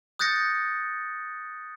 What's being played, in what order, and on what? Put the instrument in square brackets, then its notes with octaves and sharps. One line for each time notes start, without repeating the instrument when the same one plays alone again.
[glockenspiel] D#6 F#6 G6 A6 A#6 C#7